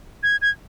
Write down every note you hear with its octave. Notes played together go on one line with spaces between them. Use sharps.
G#6
G#6